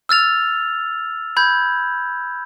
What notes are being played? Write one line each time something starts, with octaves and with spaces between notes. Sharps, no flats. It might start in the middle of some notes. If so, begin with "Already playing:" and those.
E6 F6 A6 F7
B5 G6 G#6